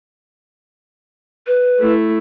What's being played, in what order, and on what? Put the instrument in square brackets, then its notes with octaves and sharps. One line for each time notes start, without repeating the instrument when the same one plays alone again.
[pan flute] B4
[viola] A3 E4